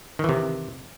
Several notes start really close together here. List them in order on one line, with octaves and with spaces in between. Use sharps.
D#3 E3 C3